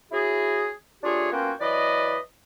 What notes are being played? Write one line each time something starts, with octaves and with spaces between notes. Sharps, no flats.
C#4 E4 F#4 G#4
A3 D4 F4 G4 G#4 C#5
A#3 B3 C#4 F4 F#4 G5
E3 F#3 B4 D5 D#5